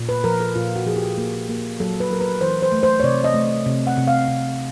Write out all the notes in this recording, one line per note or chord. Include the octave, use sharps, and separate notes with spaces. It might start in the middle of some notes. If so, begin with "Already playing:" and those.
Already playing: A#2
B4
F3 A#4
A4
A#2 F4
F#4
F3 G#4
G4
A#3 G#4
A#3
F#3 A4
B4
F#3 A#4
B4
E3 C5
C5
A3
C5
C#5
C3 D5
D#5
A3
C3
F#5
C3
F5
C3